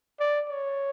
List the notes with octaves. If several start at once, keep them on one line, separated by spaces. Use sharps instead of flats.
D5
C#5